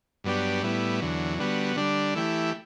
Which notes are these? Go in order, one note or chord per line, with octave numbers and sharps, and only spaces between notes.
G2 F#3 B3 D4 G4
A2 G3 B3 E4
E2 D3 F#3
D3 G3 B3 F#4
D3 G3 D4
E3 A3 E4 G4